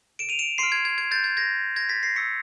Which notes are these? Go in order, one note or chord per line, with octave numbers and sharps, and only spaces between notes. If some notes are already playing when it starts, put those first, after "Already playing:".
D7 E7
D#7 F7
D7 E7
C6 C7 D7
F6
G#6
G#6
G#6
G6 A6
G#6
G#6 A#6
G#6 A#6
A6 B6
A#6 C7
C#6 E6 G6 B6 C#7